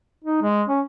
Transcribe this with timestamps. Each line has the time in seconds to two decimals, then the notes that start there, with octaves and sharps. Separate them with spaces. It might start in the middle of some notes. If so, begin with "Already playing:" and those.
0.25 D#4
0.42 G#3
0.68 C#4